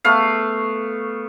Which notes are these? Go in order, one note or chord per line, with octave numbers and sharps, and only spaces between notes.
A3 B3 F5